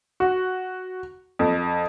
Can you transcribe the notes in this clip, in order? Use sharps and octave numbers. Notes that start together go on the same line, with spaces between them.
F#4
F2